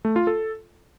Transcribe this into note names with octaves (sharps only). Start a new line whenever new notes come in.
A3
F4
A4